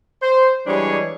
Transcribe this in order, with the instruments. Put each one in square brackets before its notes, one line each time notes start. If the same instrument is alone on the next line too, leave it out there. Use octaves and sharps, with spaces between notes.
[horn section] C5
E3 G3 G#3 D4 G#4 C#5